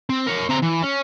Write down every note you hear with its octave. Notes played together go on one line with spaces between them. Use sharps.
C4
A#4 C#5
C4 A#5
E3
C#4